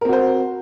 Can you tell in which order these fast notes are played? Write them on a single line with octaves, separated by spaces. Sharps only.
A#4 C4 F#4 C5